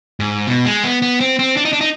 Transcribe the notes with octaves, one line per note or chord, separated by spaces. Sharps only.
G#2
B2
G#3
B3
B3
C4
C4
D4
D#4
D4
D#4